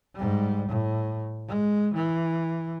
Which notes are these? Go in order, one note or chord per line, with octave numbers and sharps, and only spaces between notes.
G#2 G3
A2
G#3
E3